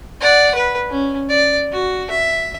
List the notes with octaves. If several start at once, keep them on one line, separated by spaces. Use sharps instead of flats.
D5 F#5
B4
C#4
D5
F#4
E5